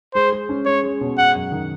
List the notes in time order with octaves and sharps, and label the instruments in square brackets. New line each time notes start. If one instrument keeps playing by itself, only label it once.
[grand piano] G#3 [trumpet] C5
[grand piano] G#3
C#4
[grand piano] G#3 [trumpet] C#5
[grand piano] G#3
B2
[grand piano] G#3 [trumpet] F#5
[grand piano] F#2
D#3